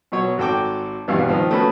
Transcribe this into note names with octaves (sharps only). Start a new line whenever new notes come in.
B2 F#3 C#5
G#1 F#4 A4 G5 D6
G#1 G2 B2 E3 F5
D#3 F3
A3 B3 C#4 F#4 B4